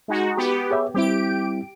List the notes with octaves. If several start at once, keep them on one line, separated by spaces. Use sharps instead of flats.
G#3 D#4 F#4
B3 G4
G#4 C#5 E5
G3 C4 E4 G4 D7